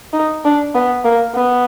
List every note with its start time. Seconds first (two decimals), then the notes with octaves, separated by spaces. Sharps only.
0.13 D#4
0.44 D4
0.75 B3
1.04 A#3
1.35 B3